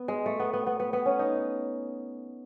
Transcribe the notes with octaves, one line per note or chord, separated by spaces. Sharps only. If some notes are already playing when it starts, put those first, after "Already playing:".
Already playing: B3
G#3
A3
B3
B3
B3
B3
B3
C#4
D#4